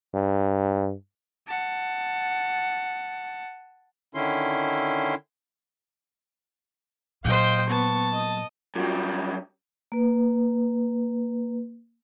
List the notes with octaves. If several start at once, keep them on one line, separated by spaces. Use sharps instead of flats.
G2
F#5 A5
D3 D#3 C#4 E4 C6
A#2 F#3 C5 D#5 F5 G5
B3 A5 C#6
D#5 D#6
F#2 G3 F4 F#4
A#3 B4